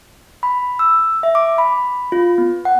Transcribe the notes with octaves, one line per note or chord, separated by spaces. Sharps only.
B5
E6
E5
D6
B5
F4
B3
F#5